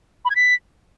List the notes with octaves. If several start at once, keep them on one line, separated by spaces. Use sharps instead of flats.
B5
G#6
B6